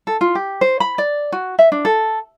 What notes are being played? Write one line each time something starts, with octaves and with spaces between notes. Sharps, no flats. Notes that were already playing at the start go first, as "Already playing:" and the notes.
A4
F4
G4
C5
B5
D5
F#4
E5
D4
A4